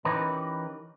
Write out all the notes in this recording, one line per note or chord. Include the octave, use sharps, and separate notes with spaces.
E3 C#4 D#4 G4 A#4 B4